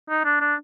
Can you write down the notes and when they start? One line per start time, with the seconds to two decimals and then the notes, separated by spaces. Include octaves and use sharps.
0.09 D#4
0.25 D4
0.41 D4